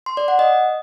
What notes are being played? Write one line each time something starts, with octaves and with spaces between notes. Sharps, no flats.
C6
D5
F#5
D#5